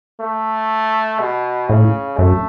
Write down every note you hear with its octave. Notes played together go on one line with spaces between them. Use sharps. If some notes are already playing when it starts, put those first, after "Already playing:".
A3
B2
A2 C#3
F#2 A3